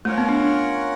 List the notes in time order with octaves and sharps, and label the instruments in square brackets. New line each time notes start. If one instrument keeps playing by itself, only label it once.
[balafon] A3 [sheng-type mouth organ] C#4 F4 A#4 C#5 F#5
[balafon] B3
D4
D4